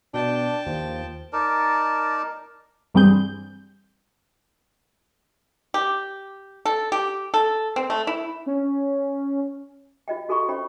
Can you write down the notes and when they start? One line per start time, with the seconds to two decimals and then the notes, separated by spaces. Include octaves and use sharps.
0.14 B2 D4 G5 A5
0.66 D#2 F3
1.33 D#4 A#4 D5 A5
2.94 G2 E3 G3 C4 G#4 G6
5.74 G4
6.65 A4
6.92 G4
7.34 A4
7.76 C4
7.90 A3
8.07 E4
8.46 C#4
10.08 F4 D#5 G5
10.29 F#4 A4 G#5 A#5 B5 C#6
10.49 C#4 C5 G5 B5